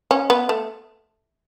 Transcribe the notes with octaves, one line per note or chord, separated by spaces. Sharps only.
C#4
B3
A3